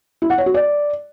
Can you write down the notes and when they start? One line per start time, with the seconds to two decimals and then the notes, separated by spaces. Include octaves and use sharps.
0.22 E4
0.30 F#5
0.38 C#5
0.46 F#4
0.54 D5